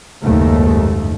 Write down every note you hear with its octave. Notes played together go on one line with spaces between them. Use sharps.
F#1 D#2 G#2 A3